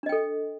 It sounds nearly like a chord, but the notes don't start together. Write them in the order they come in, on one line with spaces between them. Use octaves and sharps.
D4 D#5 G5 A4